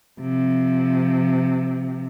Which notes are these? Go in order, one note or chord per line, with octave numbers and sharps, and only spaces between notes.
C3 F3